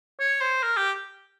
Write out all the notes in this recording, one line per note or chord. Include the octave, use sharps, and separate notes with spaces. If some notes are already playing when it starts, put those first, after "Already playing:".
C#5
C5
A#4
G4